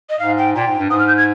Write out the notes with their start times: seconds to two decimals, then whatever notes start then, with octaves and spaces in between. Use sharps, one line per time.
0.10 D#5
0.19 G#2 F5
0.38 G5
0.55 A#2 G5
0.67 G#2
0.79 G2
0.90 G#2 D#6
0.99 F6
1.08 G6
1.17 G#6